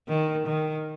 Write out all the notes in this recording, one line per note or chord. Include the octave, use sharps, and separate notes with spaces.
D#3
D#3